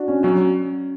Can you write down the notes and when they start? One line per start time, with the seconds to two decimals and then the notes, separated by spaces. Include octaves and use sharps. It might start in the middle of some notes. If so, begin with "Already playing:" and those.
Already playing: D4 F#4
0.08 C#4
0.23 F#3 C#4